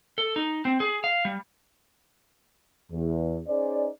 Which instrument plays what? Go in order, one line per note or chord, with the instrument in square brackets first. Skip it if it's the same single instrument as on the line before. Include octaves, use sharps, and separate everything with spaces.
[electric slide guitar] A4
D#4
C4
G#4
F5
G3
[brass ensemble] E2
C#4 D#4 G#4 C5 D5